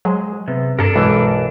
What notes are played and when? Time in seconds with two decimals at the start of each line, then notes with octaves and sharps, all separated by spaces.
0.05 F#3 G#3 G#4 C5
0.48 C3 B3
0.79 G2 D4 A4 A#4
0.96 B1 E3 G#3 A#5